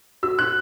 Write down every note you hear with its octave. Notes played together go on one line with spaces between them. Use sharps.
F#4 E6
F#6